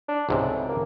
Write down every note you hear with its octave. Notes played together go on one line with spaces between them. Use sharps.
D4
C#2 G#2 C3 F#3
A2
A#3